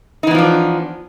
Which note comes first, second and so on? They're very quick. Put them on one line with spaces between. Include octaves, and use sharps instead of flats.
D#4 E3 B3 F3 D4